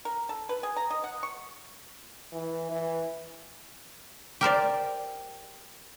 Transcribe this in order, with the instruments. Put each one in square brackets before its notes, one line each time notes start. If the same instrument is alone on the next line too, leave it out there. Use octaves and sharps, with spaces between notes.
[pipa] A#4
A4
B4
G#4
A#5
D#5
F#5
C#6
[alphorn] E3
E3
[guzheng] G4 A#4 C5 D5